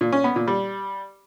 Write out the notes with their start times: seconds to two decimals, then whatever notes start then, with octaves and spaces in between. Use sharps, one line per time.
0.01 A#2
0.13 C#4
0.24 B3
0.36 A#2
0.48 G3